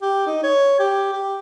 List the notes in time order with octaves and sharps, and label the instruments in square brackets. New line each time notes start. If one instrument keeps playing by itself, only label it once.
[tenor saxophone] G4
D#4
C#5
G4
G4